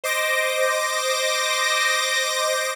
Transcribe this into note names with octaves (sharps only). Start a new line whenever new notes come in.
C5 D#5 D6 A#6